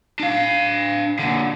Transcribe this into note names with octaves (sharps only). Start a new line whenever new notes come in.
D4 F5
A#2 D3